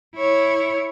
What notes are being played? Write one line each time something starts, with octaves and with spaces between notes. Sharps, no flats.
E4 C#5